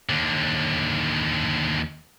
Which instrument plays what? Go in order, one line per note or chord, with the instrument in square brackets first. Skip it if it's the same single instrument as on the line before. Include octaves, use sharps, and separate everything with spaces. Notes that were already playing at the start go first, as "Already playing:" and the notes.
[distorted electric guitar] D#2 D3